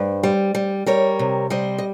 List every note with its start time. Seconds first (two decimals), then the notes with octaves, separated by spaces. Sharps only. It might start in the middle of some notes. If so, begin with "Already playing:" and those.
Already playing: G2 C5
0.23 G3
0.55 G3
0.86 G3 A#4 C#5
1.19 C3
1.50 G3 C5 D#5
1.78 D#5